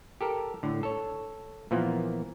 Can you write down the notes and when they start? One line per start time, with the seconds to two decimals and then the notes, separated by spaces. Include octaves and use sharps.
0.21 G4 A4 A#4
0.63 A2 D3
0.83 A4 C#5
1.71 A#2 E3 F3 A#3 B3